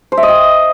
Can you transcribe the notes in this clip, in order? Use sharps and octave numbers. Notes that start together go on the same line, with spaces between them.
C5
E5
D#5
G5